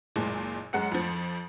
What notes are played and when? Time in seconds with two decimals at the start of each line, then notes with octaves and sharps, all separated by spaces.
0.16 F#1 A#2 G#3
0.73 F#2 G#3 F#5 C#7
0.92 F2 F3